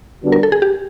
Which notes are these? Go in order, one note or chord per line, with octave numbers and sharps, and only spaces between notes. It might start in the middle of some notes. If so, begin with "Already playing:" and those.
D3 G3 B3 D4 F#4
A#4
A4
G#4
G4